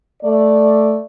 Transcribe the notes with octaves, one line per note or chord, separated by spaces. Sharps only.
A3 D5